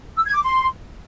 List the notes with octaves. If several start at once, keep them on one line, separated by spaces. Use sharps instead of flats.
E6
G#6
D6
C6